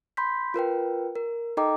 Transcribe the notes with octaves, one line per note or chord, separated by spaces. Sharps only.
B5 C6 G6 B6
F4 A#4 B4 G5
A#4
D#4 A4 D#5 G5 A#5 D6